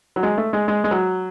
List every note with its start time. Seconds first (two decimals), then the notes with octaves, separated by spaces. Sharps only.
0.16 F#3
0.23 G#3
0.38 A3
0.53 G#3
0.68 G#3
0.84 G#3
0.91 F#3